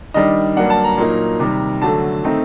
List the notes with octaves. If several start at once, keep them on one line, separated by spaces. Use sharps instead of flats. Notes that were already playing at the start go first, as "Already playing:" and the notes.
D#3 G3 D4 D#5
G2 F#3 A#3 D4 F#5
A5
A#5
A#2 F#3 A#3 D#4
C3 D#3 G3
D3 F#3 A3 A5
D#3 A3 C4 D#4